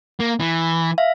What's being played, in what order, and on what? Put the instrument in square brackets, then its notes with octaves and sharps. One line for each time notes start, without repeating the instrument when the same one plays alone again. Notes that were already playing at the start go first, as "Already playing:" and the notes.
[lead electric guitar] A#3
E3
[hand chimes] E5 F5